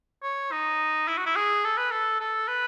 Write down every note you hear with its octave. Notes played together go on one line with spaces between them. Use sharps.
C#5
D#4
E4
F#4
E4
G#4
A4
B4
A4
A4
B4